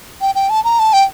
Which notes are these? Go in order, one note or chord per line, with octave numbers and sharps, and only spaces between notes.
G5
G5
A5
A#5
A5
G5